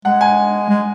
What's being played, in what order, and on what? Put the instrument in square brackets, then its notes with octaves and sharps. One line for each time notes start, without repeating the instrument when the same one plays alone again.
[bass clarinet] G#3 [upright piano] F#5
[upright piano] G#5
[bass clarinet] G#3